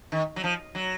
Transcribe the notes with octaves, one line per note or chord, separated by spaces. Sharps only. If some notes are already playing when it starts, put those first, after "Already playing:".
D#3
F#3
F3
F#3